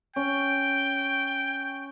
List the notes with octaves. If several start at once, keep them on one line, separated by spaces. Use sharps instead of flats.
C#4 G5